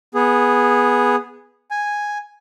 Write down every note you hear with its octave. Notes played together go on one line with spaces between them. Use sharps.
B3 G#4
G#5